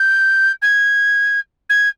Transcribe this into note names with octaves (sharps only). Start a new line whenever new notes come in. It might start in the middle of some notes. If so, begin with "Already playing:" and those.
Already playing: G6
G#6
G#6